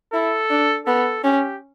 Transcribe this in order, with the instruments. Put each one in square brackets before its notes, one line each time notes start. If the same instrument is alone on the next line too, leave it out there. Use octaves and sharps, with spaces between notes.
[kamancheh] E4 [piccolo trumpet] A4
[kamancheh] D4
[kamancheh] B3 [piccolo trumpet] A4
[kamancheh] C#4 [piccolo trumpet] G4